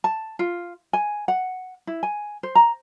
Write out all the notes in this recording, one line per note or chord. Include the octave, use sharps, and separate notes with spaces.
A5
F4
G#5
F#5
E4
G#5
C5
A#5